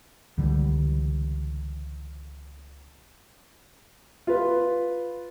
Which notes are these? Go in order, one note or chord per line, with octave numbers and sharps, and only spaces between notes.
C#2 D3 E3 G3
F4 B4